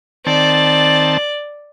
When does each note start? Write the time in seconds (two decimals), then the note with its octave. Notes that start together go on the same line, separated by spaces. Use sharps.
0.26 D#3 C4 D5 A5